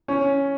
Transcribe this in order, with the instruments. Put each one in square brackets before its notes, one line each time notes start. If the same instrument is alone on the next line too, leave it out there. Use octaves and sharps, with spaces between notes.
[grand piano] C#4